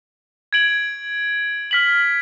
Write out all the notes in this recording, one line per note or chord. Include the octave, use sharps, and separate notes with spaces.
G#6 D7 F#7
F6 B6 F#7